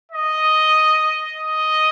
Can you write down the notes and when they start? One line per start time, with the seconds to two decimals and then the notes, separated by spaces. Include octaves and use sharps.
0.12 D#5
1.35 D#5